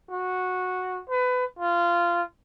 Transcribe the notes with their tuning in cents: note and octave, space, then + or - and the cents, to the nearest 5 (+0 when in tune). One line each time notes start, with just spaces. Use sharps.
F#4 -10
B4 +25
F4 -15